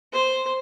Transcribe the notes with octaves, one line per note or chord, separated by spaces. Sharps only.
C5